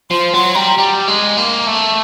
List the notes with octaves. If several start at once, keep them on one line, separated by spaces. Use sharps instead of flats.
F3 C6
F#3 C6
G3 A#5
G3
G#3
A#3
A3